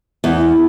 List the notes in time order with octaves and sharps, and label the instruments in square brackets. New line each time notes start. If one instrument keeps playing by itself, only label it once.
[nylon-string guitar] E2